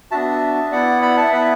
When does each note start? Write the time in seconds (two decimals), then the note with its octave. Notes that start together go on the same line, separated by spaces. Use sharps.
0.11 B3 D4 F#4 E5 A5
0.72 B3 E4 D5 F#5
1.02 F#5 B5
1.17 E5 A5
1.32 B3 E4 B4 E5